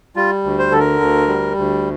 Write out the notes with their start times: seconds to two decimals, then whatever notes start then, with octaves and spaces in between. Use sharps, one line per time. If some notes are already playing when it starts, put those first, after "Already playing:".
0.16 G3 F4
0.44 D2
0.59 C5
0.72 D3 A4
0.79 A#4
1.01 D2
1.28 G3
1.57 D2